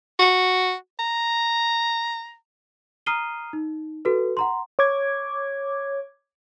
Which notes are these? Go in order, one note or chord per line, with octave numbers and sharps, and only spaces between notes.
F#4
A#5
A#5 D#6 F6 C7 D#7 G7
D#4
F#4 A4 B4
F#5 A#5 C6
C#5 D6 G#6